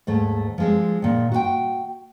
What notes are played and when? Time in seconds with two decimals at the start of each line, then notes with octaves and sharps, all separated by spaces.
0.07 D#2 G#2 A3
0.58 F3 G#3 C4
1.02 A#2 D#3
1.32 F#4 C5 G5